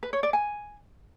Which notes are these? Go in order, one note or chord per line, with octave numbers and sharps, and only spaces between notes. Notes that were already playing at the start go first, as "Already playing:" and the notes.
B4
C#5
D5
G#5